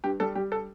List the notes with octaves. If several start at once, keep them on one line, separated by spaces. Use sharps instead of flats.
G2 G4
G3 A4
G3 G4
A4